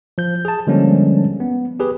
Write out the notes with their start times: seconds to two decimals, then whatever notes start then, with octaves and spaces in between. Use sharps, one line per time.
0.18 F3 G6
0.45 G#4 A5
0.67 D3 F3 G3 G#3 A#3 C#4
1.40 B3
1.80 G4 G#4 B4